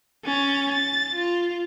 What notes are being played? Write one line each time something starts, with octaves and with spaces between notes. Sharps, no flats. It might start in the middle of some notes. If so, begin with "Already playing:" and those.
C#4 A6
A6
F4